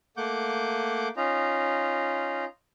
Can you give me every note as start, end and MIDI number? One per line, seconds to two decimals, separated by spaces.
0.17 1.08 57
0.17 1.08 58
0.17 1.08 78
0.17 1.08 86
0.17 1.08 91
1.17 2.45 61
1.17 2.45 63
1.17 2.45 65
1.17 2.45 82